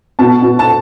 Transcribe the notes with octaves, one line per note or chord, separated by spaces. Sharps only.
B2 A5
B2
A5